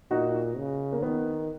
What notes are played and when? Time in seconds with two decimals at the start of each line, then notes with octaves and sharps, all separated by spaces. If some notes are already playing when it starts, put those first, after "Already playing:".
0.11 A#2 D#4 F#4
0.58 C#3
0.93 A#3
1.02 D#3 B3